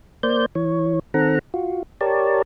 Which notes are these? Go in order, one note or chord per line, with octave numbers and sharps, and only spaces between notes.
A#3 C5 D5 G6
E3 C#5
D#3 C4 A4 F#5 A#5
F4 F#4
G4 A#4 C#5 D5 A5